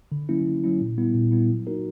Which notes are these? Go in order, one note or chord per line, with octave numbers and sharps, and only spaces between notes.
D3
F#3 A#3 C#4 E4
D3
F#3 A#3 C#4 E4
A#2
G3 B3 E4
A#2
G3 B3 E4
F#3
A#3 D#4 F#4 A#4